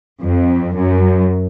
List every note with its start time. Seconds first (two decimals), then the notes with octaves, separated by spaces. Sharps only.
0.21 F2
0.74 F#2